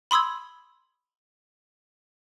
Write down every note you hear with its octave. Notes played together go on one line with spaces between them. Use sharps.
B5 C6 D#6 E6 G#6